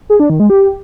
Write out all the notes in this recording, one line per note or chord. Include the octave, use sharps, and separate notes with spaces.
G#4
D4
D#3
G#3
G4